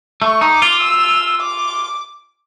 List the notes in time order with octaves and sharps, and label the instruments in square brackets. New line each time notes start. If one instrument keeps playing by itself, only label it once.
[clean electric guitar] A3 [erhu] C#6
[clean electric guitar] D#4
[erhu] D6
[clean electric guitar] F4
[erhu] E6
D6